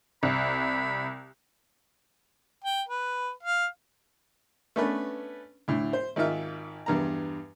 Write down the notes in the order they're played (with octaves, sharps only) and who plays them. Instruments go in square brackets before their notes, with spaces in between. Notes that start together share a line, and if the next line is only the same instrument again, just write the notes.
[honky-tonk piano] C2 [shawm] B5
[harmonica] G5
B4
F5
[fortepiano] A3 B3 C#4 D4 B4
D2 A2 D3
C5
G#1 G#2 D#3 F4 E5 F6
E2 G2 A#5